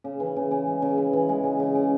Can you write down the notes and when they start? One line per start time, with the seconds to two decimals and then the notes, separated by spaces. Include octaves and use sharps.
0.04 C#3
0.20 E3
0.36 C#3
0.51 C#3
0.67 G#3
0.82 C#3
0.98 E3
1.13 E3
1.29 G#3
1.44 C#3
1.59 C#3
1.75 C#3